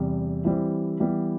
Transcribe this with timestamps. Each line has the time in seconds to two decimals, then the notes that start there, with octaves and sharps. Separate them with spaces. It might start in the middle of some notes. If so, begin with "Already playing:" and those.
Already playing: E2 C3 G3
0.45 E3 G3 C4
1.00 E3 G3 B3